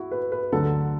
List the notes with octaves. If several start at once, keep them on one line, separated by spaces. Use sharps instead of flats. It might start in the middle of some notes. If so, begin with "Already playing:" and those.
Already playing: E4 F#4
B4
B4
D2 D3 F#3 A4